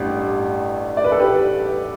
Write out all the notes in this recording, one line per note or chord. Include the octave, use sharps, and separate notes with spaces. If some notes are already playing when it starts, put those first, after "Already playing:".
Already playing: A1 G2 G3 G4
D5
B4
A4
G4 B4